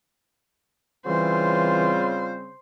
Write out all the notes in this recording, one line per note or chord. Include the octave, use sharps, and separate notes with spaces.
C#3 E3 G3 C4 F4 C5